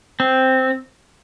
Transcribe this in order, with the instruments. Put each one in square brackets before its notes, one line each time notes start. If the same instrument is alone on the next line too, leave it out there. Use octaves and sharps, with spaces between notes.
[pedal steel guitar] C4